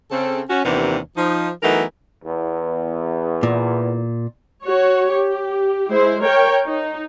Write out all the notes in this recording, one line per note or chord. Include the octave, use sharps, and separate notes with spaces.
C#3 C4 A4
C#4 F#4
D#2 C3 E3 B3 D4 A#4
F3 D#4
E3 F#3 A3 B3 D#4 A#4
E2
A#2
F#4 C#5
G4
G#3 E4 C5
A#4 C#5 G5
D#4